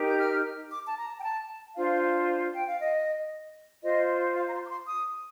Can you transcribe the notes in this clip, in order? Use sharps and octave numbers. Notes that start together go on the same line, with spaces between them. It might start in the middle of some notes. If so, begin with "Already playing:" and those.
Already playing: D#4 G4 A#4
G6
F6
D6
A5
A#5
G5
A5
D4 F4 C5 F5
G5
F5
D#5
F4 C5 D#5
F5
A#5
C6
D6
C6
D#6